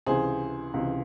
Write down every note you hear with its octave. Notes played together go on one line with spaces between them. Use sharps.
C#2 C3 E3 G#4 C5
C#2 C3 E3